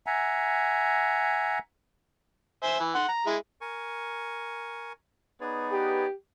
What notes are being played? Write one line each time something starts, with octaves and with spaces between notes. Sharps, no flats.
E5 F#5 G#5 A#5
C5 E5 G#5
E3
F#5 C6
A#5
G#3 E4
A#4 G#5 C#6
B3 D#4 G#4 B4 C#5 D5
G4